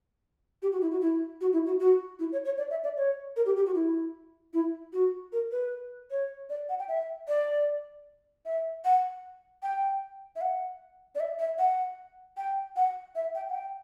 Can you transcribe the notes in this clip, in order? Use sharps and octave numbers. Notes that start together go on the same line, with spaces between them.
G4
F#4
E4
F#4
E4
F#4
E4
F#4
F#4
E4
C#5
C#5
D5
E5
D5
C#5
A#4
G4
G4
F#4
E4
E4
F#4
A#4
B4
C#5
D5
F#5
G5
E5
D5
E5
F#5
G5
E5
F#5
D5
E5
E5
F#5
G5
F#5
E5
G5
F#5
G5